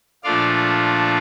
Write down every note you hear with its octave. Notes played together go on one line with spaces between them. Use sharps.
A#2 F3 A3 D4 F4 D5 F5